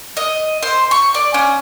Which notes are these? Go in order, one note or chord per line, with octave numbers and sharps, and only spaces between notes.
D#5
C5
C#6
D5
C#4